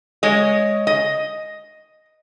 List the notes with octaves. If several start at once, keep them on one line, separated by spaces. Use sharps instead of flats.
G#3 C#5 D#5
D#5